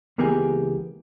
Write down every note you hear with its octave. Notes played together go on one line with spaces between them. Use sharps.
C#2 E3 A#3 B3 G4 G#4